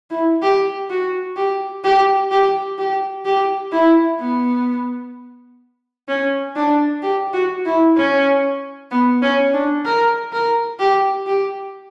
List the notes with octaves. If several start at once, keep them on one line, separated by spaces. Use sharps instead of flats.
E4
G4
F#4
G4
G4
G4
G4
G4
E4
B3
C#4
D4
G4
F#4
E4
C#4
B3
C#4
D4
A#4
A#4
G4
G4